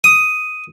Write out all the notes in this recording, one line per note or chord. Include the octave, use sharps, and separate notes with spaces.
D#6